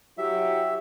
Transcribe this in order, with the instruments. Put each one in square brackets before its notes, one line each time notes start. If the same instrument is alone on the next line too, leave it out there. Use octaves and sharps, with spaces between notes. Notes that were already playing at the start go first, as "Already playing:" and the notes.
[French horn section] F#3 E4 G4 [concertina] E5